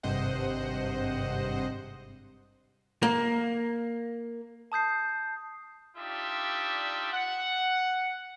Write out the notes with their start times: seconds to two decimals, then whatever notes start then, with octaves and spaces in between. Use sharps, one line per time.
0.03 G#1 G2 C3 C5 D#5 F#5
3.03 A#3
4.72 A5 D#6 G6 C7
5.97 D4 D#4 F4 G4 D5 E5
7.12 F#5